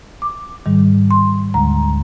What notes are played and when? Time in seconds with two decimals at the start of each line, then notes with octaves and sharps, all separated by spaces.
0.22 D6
0.66 G#2 D#3 G3
1.11 C6
1.54 D2 D3 G#3 A#5